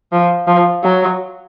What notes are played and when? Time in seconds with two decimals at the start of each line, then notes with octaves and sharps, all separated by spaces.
0.12 F3
0.47 F3
0.83 F#3